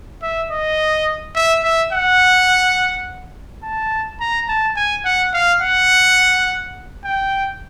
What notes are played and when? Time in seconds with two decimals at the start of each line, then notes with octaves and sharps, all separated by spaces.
0.22 E5
0.51 D#5
1.35 E5
1.63 E5
1.93 F#5
3.63 A5
4.20 A#5
4.48 A5
4.76 G#5
5.05 F#5
5.34 F5
5.62 F#5
7.05 G5